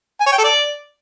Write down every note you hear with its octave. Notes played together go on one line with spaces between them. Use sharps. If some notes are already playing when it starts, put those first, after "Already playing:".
G#5
C#5
G5
A4
D5